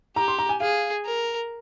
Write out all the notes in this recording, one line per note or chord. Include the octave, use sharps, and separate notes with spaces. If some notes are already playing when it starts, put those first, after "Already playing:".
G4 A#5
C6
A#5
G#5
G#4 F5
A#4